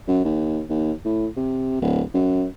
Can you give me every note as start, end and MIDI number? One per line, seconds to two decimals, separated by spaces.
0.08 0.24 42
0.25 0.62 39
0.70 0.92 39
1.05 1.27 45
1.37 1.78 48
1.81 2.02 26
2.14 2.45 42